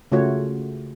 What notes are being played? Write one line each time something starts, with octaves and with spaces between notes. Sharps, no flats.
C#3 A3 F4 F#4 C#5